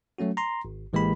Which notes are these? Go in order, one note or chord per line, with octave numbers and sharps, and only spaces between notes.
F#3 A3 C#4 F#4
A#5 C6
G#1
A1 E3 G#3 A#3 G4 B5